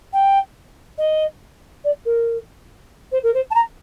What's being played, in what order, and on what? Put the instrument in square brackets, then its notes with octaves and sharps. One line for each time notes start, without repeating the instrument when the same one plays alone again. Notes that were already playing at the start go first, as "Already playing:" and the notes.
[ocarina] G5
D#5
D5
A#4
C5
A#4
C5
A5
A#5